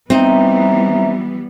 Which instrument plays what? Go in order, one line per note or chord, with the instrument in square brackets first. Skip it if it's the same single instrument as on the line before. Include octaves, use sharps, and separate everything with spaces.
[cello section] E3 G3 B3 [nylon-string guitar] C4 D#4 [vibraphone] E5 A#5